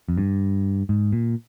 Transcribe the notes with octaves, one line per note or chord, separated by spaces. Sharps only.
F2
G2
G#2
A#2